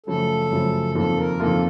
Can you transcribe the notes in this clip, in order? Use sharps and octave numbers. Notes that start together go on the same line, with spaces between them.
F#2 C#3 F3 A3 A4
F#2 C#3 F3 A3
F2 D#3 A#3 F4 A4
A#4
F2 D#3 A#3 F4 A4